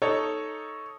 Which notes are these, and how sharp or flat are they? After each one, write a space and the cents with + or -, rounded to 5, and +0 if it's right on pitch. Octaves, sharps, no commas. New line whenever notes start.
D#4 +0 A4 +0 C#5 +0